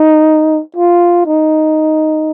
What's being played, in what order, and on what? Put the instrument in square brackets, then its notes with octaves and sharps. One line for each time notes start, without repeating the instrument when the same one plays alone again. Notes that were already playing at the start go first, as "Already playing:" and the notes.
Already playing: [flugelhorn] D#4
F4
D#4